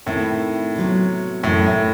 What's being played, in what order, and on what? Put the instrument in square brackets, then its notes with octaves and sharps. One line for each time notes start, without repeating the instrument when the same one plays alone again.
[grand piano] A2 [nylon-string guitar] D#3 A3 C4 E4
[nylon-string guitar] C3 F#3 B3
[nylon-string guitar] F#2 E3 A3 [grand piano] A2
[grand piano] A2